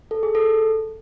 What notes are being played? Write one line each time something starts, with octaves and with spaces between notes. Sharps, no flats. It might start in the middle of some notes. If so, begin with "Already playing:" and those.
A4
G#4
A4